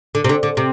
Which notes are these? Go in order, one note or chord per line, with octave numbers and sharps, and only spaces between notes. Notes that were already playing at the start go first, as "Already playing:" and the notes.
D3
C3
D3
D3
C3